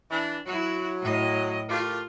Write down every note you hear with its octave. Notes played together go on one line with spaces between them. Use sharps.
E3 D4
F#3 E4 F#4
A2 D#5
A3 F4 G4 A#4